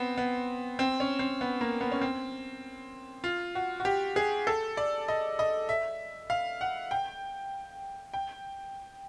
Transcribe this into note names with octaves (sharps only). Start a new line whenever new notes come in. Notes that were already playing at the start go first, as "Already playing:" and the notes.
Already playing: B3 C4
B3
C4
C#4
C4
B3
A#3
B3
C#4
C4
F4
F#4
F#4
G4
G#4
A4
D5
D#5
D#5
E5
F5
F#5
G5
G5